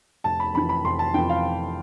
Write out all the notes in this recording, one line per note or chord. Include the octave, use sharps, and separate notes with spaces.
F1 A5
B5
F2 E3 B5
B5
F1 C6
A5
F2 E3 G5
F5